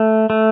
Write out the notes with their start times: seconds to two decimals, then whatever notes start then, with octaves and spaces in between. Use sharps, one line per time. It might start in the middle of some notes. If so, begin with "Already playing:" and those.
Already playing: A3
0.30 A3